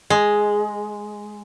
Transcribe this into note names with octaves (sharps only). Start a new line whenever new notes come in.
G#3